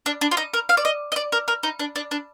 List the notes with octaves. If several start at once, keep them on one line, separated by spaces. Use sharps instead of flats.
D4
D4
F4
D#4
A#4
F5
D5
D#5
D#5
D5
A#4
A#4
D#4
D4
D4
D4